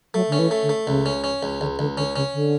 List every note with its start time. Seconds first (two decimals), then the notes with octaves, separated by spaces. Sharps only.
0.14 F#3 A3
0.28 D3 C#4
0.39 E3
0.51 A3
0.63 D3
0.69 A3
0.87 C#2 C#3
1.06 C#4
1.24 C#4
1.43 C#2
1.60 C#2 D3
1.79 C#2 D3
1.97 D3 C#4
2.16 C#3 C#4
2.34 D3